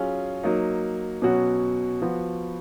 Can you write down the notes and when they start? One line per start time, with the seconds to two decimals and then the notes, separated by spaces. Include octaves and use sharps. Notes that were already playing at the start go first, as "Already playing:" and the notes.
Already playing: F#3 C#4 F4 G#4
0.43 F#3 A#3 D#4
1.22 B2 F#3 C#4 F#4
2.02 F3 B3 F#4